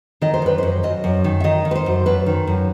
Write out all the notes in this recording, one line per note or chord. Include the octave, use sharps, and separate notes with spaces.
D#3 D#5
C5
F#2 B4
F#2 C5
F#2 D#5
F#2
D#3
E5
D#3 D#5
D#3
B4
C5
F#2
F#2 B4
D#3
F#2